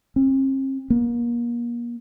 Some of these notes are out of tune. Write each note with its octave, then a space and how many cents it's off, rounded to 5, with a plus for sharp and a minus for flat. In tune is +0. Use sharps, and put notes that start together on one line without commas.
C4 +45
A#3 +35